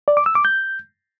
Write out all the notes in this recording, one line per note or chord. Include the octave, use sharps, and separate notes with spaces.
D5
D6
E6
D6
G6